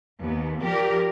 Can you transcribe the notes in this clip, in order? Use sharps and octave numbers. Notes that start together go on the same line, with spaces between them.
D#2 B3
F3 G4 A#4 D5